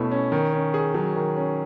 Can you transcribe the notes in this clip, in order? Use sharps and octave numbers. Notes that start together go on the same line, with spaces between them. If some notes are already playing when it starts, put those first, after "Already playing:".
Already playing: B2 A3 C#4 E4
C#4
D#3
C#4
G#4
F#3
D#3
C#4